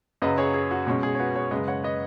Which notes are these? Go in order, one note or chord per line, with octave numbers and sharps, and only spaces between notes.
F#2 C#3 F#3 B4 D#5
G#4 C#5
G#4
F#4
B2 G#3 C#4
G#4
C#5
F#4 B4
G#4 C#5
F#2 C#3 G#3 B4 D#5
C#5 F#5
B4 D#5